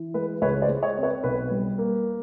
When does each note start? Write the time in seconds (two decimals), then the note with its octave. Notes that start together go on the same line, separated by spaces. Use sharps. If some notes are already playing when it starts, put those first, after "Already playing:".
Already playing: E3
0.14 G#3 B4
0.41 C#2 B4 C#5
0.62 C5 D5
0.69 G#3
0.82 C#5 D#5
0.96 C4
1.03 B4 C#5
1.23 B1 B4
1.51 G3
1.78 A#3